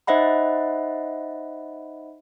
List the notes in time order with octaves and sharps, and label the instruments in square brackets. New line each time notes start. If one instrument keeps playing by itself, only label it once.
[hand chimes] D#4 C5 D#5 E5 F#5 B5